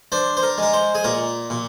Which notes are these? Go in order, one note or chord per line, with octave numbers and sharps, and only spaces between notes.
D4 C5
C5
A#4
G#3 A#4
C5
G#4
A#2 A#4
A#2